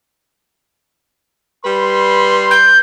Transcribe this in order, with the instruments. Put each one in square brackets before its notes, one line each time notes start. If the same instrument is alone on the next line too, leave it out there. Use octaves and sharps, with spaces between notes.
[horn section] G3 B4 C6
[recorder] G6